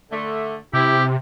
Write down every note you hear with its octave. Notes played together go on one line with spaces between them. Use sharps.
D3 A3
C3 E4 G4